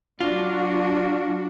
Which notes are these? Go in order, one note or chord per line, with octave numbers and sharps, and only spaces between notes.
F#3 D4 F4 F#4